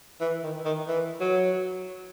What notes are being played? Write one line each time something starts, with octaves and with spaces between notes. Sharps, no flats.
E3
D#3
D#3
E3
F#3